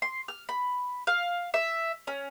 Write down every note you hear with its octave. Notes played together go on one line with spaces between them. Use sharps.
C6
F6
B5
F5
E5
C#4